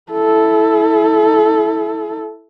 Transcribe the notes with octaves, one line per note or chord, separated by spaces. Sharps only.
E4 A4